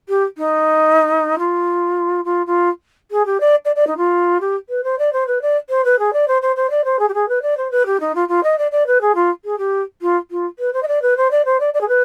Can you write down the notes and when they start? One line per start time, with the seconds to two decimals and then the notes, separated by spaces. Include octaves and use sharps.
0.09 G4
0.38 D#4
1.39 F4
2.25 F4
2.47 F4
3.11 G#4
3.26 G4
3.40 D5
3.65 D5
3.76 D5
3.87 D#4
3.97 F4
4.41 G4
4.70 B4
4.84 C5
4.99 D5
5.13 C5
5.27 B4
5.42 D5
5.70 C5
5.85 B4
5.99 G#4
6.13 D5
6.28 C5
6.42 C5
6.56 C5
6.70 D5
6.85 C5
6.99 G#4
7.09 G4
7.14 G#4
7.29 B4
7.42 D5
7.57 C5
7.71 B4
7.86 G4
8.00 D#4
8.15 F4
8.29 F4
8.44 D#5
8.58 D5
8.72 D5
8.87 B4
9.01 G#4
9.15 F4
9.45 G#4
9.58 G4
10.02 F4
10.31 F4
10.59 B4
10.73 C5
10.83 D#5
10.88 D5
11.02 B4
11.17 C5
11.31 D5
11.45 C5
11.60 D5
11.74 D5
11.81 G#4
11.89 B4